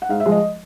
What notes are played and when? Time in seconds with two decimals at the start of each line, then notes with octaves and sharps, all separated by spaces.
0.02 F#5
0.09 G#2 F5
0.20 E5
0.26 F3 G#3
0.32 D#5